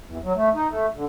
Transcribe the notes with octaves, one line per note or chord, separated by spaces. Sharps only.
E2
F#3
A3
D#4
A3
D3